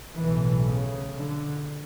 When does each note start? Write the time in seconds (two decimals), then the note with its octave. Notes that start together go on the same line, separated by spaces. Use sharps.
0.18 B1 A2 E3
0.67 C#3
1.15 D3